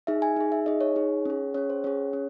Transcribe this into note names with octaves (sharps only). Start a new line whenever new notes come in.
D#4 G#4 E5
G#5
D#4 G#4
E5
D#4 G#4 D#5
C#5
D#4 G#4
C#4 G#4
C#4 G#4 C#5
C5
C#4 G#4 C#5
C#4